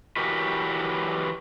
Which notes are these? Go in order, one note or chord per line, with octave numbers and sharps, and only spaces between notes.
E3 F#3 F#4 G4 A#4 B4